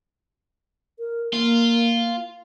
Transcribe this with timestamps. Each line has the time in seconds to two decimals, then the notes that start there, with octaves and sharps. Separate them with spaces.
0.99 A#4
1.33 A#3 F4